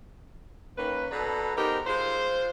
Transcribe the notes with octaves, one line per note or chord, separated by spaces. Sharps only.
D#3 A#3 C#4 B4
B2 A4 B4 D5 A#5
B3 D#4 G4 A#4 C5
G#3 F4 C5